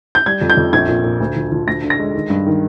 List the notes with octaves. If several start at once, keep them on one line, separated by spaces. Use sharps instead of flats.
G6
G3 G#6
F2
G6
F2
A#1 G#6
A#2
A#2
D2
F3
F3
D2 A#6
D3
A#6
G#3
D#3
G2
D#3